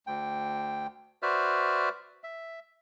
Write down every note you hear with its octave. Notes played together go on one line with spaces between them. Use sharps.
D2 G5
F#4 B4 C5 D5 E5 F6
E5